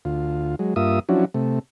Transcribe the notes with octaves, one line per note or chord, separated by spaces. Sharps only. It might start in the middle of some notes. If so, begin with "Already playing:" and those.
D2 F4
F#3 G#3
G2 A#3 F4 E5 D#6
F3 F#3 C#4 D4 E4 F#4
C3 A3